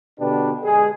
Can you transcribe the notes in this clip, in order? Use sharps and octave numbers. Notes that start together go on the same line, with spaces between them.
B2 D3 D4 G4 B4
G#3 G#4